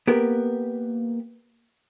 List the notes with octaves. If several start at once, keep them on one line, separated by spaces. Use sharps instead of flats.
A#3 B3 G4 A#4